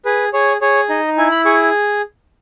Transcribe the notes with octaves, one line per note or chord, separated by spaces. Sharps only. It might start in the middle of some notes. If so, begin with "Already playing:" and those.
G#4 B4
G#4 C#5
G#4 C#5
D#4 D#5
E4 G#5
B5
G#4 C#6